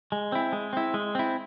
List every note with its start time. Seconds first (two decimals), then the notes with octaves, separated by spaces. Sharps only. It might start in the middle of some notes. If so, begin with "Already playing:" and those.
0.12 G#3
0.32 C4 E4
0.53 G#3
0.73 C4 E4
0.94 G#3
1.15 C4 E4